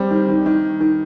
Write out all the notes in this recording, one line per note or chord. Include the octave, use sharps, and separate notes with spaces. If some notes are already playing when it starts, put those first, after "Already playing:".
Already playing: G3 C4
D#3
D#3
D#3
D#3